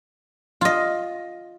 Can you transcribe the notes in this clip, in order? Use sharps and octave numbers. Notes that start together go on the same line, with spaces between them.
F4 D#5